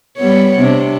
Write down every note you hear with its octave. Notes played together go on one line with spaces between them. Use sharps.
G3 B3 C#5
C3 D4